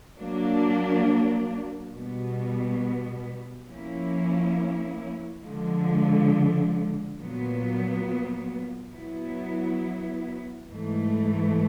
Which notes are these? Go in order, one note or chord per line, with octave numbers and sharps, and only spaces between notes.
F#3 A#3 D4
B2 G3 B3
F3 A#3 C#4 E4
D3 F3 G#3
A#2 F#3 B3
F#3 B3 E4
G#2 E3 A3